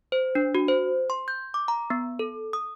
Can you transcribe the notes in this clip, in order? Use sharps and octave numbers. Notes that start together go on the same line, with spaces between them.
C5
D4
F#4
C5
C6
G6
D6
A#5
B3
A4
D#6